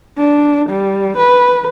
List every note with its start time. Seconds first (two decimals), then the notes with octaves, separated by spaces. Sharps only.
0.18 D4
0.69 G3
1.17 B4